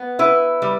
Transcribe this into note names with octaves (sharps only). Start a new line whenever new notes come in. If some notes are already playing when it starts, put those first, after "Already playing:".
Already playing: B3
E4 B4
G3